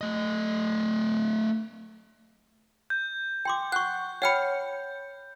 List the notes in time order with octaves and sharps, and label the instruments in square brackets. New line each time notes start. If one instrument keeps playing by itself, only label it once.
[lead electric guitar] A3 D#5
[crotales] G6
[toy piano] G5 C6 D6
[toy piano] F#5 C#6 [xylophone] F#6
[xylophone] C#5 F6 C#7 [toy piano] F#5 G5 B5